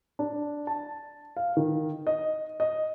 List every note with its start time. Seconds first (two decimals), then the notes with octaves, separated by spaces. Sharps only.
0.19 D4
0.67 A5
1.37 F5
1.57 D#3
2.07 D#5
2.60 D#5